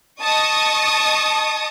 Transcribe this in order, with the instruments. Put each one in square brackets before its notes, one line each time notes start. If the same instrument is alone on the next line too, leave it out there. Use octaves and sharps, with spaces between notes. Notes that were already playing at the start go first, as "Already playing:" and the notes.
[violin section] D#5 A5 C#6 D#6